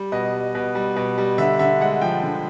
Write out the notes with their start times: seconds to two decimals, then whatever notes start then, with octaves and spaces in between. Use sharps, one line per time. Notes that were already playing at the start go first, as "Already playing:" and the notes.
Already playing: G3
0.12 B2 D#5
0.33 G3
0.55 B2
0.75 G3
0.96 B2
1.18 G3
1.38 D3 E5
1.59 D3 E5
1.81 G#3 F#5
2.01 F3 G5
2.23 D3